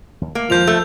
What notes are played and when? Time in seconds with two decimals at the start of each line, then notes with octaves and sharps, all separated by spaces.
0.21 D#2
0.35 A3 A#3
0.50 F2 D#3 F3 G#3 G6 F7
0.67 A3